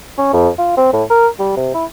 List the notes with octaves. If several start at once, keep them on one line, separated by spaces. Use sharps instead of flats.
C#4
F2
F4
C4
A2
A#4
G3
C3
E4